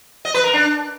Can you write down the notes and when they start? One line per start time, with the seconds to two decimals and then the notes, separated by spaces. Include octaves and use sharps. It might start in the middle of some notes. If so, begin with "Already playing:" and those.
0.25 D#5
0.34 B4
0.44 A#4
0.53 D4